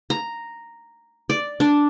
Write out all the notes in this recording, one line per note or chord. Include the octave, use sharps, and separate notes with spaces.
A#5
D5
D4